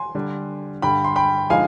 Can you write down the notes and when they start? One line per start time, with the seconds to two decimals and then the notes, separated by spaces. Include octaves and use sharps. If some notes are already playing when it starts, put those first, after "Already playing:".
Already playing: G#5 C6
0.15 D3 G3 D4
0.82 G2 D3 G3 G5 B5
1.04 C6
1.16 G5 B5
1.50 D3 F3 G#3 D#4 F5 G#5